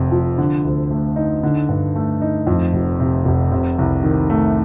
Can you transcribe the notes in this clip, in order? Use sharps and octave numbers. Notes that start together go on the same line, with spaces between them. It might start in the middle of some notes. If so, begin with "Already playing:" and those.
Already playing: F1 F2 C3
F3
D3
D2
A3
D#4
D3
G2
A3
D#4
F2
F1
C3
F1
C3
C2
D#3
A3